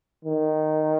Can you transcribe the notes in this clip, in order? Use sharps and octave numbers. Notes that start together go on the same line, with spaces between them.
D#3